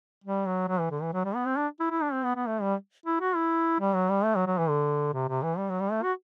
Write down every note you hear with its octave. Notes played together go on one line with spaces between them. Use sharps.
G3
F#3
F#3
E3
D3
E3
F#3
G3
B3
C4
D4
E4
E4
D4
C4
B3
B3
A3
G3
E4
F#4
E4
G3
F#3
G3
A3
F#3
F#3
E3
D3
C3
C3
E3
G3
F#3
G3
A3
F#4